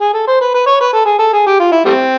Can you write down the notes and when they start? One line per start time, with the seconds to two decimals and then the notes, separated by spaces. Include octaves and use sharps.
0.01 G#4
0.13 A4
0.27 C5
0.41 B4
0.54 B4
0.66 C#5
0.81 B4
0.93 A4
1.06 G#4
1.19 A4
1.33 G#4
1.46 G4
1.60 F4
1.72 E4
1.85 G3 A3 C4